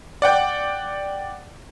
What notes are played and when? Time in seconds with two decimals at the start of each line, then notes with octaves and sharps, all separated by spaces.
0.22 D5 F#5 G5